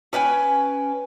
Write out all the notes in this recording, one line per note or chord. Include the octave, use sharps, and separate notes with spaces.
C#4 B4 G5 G#5